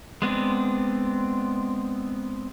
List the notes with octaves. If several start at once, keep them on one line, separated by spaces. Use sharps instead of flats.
G#3 B3 C4 D4